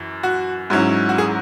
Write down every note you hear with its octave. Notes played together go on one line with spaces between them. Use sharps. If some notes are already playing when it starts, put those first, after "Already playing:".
Already playing: F#2 E3
F#4
G#2 F#3 C#4 E4
F#4
G#4